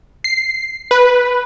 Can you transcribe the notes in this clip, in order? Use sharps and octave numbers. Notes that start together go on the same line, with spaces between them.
C7
B4